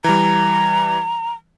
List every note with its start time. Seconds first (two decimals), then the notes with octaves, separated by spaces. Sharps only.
0.04 E3 G3 A#5